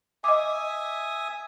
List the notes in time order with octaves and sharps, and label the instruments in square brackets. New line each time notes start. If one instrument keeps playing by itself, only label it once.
[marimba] D#5 D6 [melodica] E5 G#5 D#6